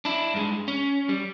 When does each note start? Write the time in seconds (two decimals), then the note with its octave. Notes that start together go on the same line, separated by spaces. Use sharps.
0.05 D4 E4
0.34 G2 G#3
0.68 C#4
1.09 G3